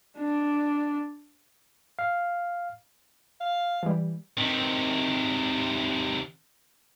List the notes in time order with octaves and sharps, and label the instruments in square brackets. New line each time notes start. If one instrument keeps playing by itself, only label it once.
[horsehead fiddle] D4
[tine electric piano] F5
[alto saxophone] F5
[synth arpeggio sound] E3 G3
[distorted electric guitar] C3 D#3